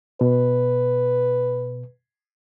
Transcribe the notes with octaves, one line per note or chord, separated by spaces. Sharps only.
B2 B4